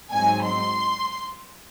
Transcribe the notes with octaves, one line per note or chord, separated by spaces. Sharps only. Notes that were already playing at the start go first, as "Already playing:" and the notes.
G#2 F#3 C4 D#4 G#5
C6